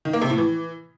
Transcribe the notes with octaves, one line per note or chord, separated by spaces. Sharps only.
D#3
A#3
C3
A2
E3